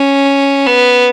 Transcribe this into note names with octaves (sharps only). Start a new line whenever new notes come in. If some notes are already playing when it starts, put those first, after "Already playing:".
Already playing: C#4
B3